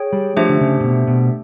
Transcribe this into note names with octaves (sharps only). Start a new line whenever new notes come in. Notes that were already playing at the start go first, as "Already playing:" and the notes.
Already playing: G#4 C#5 G5
G3
F3 A3 D4 G4 C5 E5
D3
C#3
A#2
B2
B2